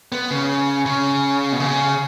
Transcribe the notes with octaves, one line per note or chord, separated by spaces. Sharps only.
B3
C#3
C#3
B2
C#3